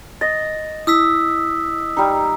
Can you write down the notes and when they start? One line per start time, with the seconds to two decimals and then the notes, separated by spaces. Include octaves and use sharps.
0.21 D#5 A6 A#6
0.87 E4 D#6 E6 B6
1.97 G3 D#4